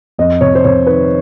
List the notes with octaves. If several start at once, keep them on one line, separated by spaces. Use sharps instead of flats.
F2 D#5
C3 C#5
C5
C3 C#5
D#3 B4